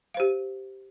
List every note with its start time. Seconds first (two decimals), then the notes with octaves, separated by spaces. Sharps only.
0.14 F5
0.17 C5
0.20 G4